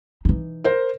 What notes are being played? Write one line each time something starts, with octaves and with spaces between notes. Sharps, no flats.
E3 D#4
A#4 C5